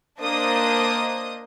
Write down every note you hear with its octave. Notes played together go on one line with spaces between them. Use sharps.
A#3 D4 C5 D#5 D#6